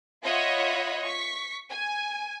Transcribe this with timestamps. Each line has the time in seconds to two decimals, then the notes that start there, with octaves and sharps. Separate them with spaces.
0.23 F4 C#5 D#5 E5 F#5 B5
1.04 C#6 B6
1.70 G#5